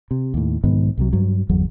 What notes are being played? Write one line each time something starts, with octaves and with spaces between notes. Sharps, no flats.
C3
D#2 A2
B1 G#2 D#3 B3
C2 C3 F#3
G2 F#3
G1 E2 F#3